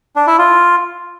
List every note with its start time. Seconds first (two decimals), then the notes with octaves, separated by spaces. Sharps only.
0.16 D4
0.27 E4
0.39 F4